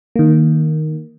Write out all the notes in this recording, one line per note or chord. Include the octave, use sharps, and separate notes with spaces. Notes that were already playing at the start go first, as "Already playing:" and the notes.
D#3 A#3